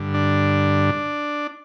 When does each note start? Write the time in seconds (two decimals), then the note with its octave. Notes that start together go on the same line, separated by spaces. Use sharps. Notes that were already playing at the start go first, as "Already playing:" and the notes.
Already playing: G2 D3
0.14 D4